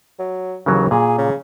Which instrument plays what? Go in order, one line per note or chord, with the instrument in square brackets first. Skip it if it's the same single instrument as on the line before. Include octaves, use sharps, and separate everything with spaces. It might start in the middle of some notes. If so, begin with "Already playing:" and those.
[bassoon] F#3
[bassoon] D#2 [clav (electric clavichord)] C#3 E3 F#3
[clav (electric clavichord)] A#2 [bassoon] G#4
[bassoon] C#3